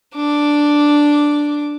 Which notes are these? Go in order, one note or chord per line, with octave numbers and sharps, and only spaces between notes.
D4 D6